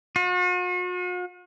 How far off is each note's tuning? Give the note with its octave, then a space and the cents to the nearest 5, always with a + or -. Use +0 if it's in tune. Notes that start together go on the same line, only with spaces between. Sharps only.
F#4 -45